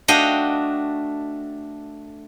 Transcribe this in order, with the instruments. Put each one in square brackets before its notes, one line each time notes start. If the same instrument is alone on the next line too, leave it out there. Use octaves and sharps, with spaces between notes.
[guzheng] A3 D4 F#4 D#5 F5 G5